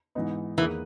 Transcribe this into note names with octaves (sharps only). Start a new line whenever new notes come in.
G#2 E3 B3 D#4
E2 D#3 E3 A#3 E4 G#4